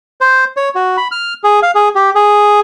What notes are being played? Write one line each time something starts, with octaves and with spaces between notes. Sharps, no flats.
C5
C#5
F#4
B5
F6
G#4
F5
G#4
G4
G#4